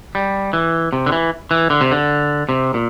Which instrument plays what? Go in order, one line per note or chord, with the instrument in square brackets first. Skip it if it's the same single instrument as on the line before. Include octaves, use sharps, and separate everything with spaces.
[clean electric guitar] G3
E3
C3
D3
E3
E3
D3
C3
D3
C3
A#2